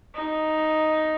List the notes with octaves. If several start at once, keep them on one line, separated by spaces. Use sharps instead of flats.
D#4